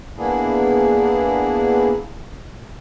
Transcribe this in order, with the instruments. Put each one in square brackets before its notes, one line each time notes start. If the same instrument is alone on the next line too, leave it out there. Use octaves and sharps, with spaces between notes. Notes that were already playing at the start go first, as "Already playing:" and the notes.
[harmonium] A#3 B3 D4 E4 G#4